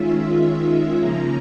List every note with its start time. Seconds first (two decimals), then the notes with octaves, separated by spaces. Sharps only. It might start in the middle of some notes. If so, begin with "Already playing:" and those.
Already playing: D#3 G#3 C#4 F4 E5
0.96 C#3 F3 A#3 C#4 A#5